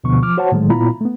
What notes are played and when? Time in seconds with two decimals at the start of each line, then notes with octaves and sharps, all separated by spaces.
0.04 D2 B2 D3 F3 B3 C#6
0.22 F3 D6 F6
0.37 F#4 C5 C#5 F#5 A5
0.52 A2 D#3 F#3 G#3 A3
0.70 A#2 B3 E4 F4 A#5 B5
1.01 A3 B3